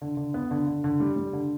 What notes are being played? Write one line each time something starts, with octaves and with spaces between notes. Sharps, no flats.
D3
D3
B3
D3
D3
D3
G3
G3
D3